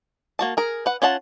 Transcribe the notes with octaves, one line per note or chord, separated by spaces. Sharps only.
A#3 F#4 A5
G#4 A#4
B4 F#5
C#4 F4 F#5 A5